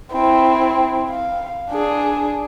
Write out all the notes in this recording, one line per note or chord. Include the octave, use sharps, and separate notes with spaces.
C4 E4
F5
D4 G#4